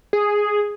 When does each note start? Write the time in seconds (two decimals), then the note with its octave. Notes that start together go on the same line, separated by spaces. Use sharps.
0.13 G#4